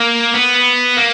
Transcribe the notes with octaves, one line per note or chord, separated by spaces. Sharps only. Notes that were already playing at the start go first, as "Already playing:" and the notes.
Already playing: A#3
B3
A#3